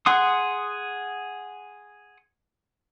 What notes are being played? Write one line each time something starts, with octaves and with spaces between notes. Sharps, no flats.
G#4 F#5 C6 D#6